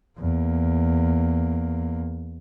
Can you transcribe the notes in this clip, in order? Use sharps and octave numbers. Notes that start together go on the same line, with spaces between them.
E2 A#3